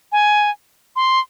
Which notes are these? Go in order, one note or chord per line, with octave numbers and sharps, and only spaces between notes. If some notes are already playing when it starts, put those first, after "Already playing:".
G#5
C6